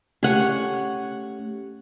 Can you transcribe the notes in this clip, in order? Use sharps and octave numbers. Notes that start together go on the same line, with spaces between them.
A3 C#4 G4 C#5 F#5 G#5